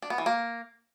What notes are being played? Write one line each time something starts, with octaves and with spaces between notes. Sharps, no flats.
D4
B3
E3
A#3